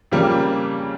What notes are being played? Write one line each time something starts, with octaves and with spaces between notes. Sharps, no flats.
F2 C#3 G3 A#3